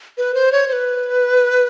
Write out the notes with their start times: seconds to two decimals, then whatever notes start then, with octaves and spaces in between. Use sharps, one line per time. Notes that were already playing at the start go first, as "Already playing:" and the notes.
0.18 B4
0.34 C5
0.52 C#5
0.68 C5
0.73 B4